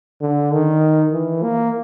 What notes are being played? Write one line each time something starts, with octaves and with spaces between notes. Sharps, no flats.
D3
D#3
E3
A#3